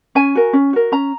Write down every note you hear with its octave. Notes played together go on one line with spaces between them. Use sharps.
C#4 G#5
F#4 A#4
C#4
F#4 A#4
C#4 A#5